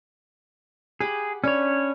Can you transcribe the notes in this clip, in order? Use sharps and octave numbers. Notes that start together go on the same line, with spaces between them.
G4 G#4 F#5 B5
C#4 D4 B4 C#5